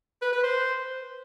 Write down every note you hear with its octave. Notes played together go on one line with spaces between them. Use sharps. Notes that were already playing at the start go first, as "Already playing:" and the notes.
B4
B4
C5